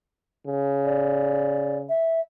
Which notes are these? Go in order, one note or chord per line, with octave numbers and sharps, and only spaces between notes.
C#3
D5
E5